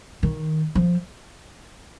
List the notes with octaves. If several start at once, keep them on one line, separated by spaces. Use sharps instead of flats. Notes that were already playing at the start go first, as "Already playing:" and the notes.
D#3
F3